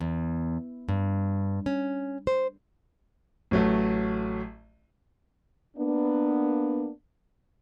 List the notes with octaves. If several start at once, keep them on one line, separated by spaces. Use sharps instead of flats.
E2
G2
C#4
C5
A1 F#3 A3
A#3 B3 D4